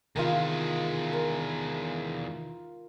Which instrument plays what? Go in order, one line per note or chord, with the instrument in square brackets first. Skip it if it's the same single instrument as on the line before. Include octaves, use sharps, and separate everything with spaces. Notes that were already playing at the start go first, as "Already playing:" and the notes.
[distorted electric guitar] E2 G#3 [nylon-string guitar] C3 D#3 F5 [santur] F4 A#4
[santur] A#4